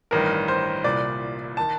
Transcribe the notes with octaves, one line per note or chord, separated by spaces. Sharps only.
A1 G2 D#3 A#4
C5
C2 A#2 D5
D#3 A5